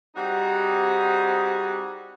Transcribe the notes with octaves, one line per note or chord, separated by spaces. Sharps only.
G3 C4 D#4 F#4 G#4